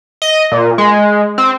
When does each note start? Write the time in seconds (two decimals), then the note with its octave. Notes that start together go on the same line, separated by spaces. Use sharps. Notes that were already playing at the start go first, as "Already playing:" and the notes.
0.22 D#5
0.52 A#2
0.78 G#3
1.38 C4